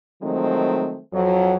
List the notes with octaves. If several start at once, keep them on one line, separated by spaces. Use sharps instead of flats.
D#3 F3 F#3 G#3 A3 C4
F2 F#3